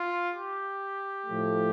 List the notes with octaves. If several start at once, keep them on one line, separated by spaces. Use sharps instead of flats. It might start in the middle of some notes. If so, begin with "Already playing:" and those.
Already playing: F4
G4
A2 F3 A3